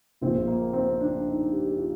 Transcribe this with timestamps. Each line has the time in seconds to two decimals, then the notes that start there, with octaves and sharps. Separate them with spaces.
0.21 A#1 A#2 F3 C4
0.47 A#3
0.73 C4
1.01 D4
1.26 D#4
1.53 G4
1.78 F4